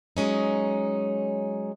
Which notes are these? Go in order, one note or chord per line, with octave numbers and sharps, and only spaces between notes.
F#3 G#3 C#4 D#4